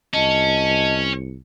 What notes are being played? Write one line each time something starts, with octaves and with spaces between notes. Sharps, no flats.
C2 C#4 D#5 A5